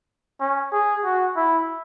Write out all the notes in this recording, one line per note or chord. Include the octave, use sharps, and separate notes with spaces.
C#4
G#4
F#4
E4